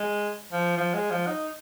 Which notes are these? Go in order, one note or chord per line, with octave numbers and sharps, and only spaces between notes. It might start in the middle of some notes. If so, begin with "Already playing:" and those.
Already playing: G#3
F3
F3
G#3
F3
D#4